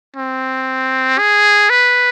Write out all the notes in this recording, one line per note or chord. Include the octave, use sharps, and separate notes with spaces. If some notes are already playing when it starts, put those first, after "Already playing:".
C4
G#4
B4